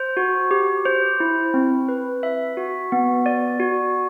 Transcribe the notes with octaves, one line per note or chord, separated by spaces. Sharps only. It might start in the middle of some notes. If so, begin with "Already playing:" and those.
Already playing: C5
F#4
G4
C5
E4
C4
B4
E5
F#4
B3
D5
F#4